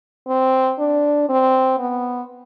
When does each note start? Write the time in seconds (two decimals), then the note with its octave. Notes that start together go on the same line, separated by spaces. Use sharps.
0.28 C4
0.79 D4
1.29 C4
1.78 B3